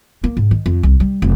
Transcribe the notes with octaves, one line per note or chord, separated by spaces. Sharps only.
A#3
G#2
D#3
F2
C2
G3
F1